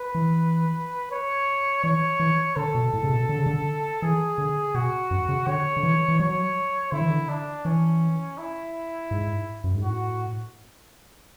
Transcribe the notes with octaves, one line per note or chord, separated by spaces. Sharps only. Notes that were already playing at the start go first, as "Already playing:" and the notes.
Already playing: B4
E3
C#5
E3 C#5
E3
D3 A4
B2
A2
C#3
B2
D3
C#3
D3
E3 G#4
D3
B2 F#4
F#2
C#3
D3 C#5
D3
E3
E3
F#3 C#5
D3 E4
E3
D3
D4
E3 C#4
E4
G#2
F#2
G#2
A2 F#4